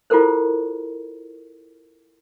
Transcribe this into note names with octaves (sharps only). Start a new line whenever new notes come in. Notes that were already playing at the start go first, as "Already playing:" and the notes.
E4 F4 G4 A4 A#4 C5